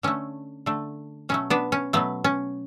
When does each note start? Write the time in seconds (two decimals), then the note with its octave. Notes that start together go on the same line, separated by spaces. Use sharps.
0.03 D3 A3 C#4
0.66 D3 A3
1.29 B2 F#3 A3 C#4
1.50 B3 D4
1.72 C#4
1.93 B2 F#3 A3 B3
2.24 C#4